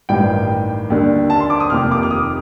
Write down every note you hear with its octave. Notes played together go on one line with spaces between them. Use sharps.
A1 G2 D#3 G5
D#2 D3
A5
C6
D6
D#6
F1 D#2 D#3 F6
D6
F6
D#6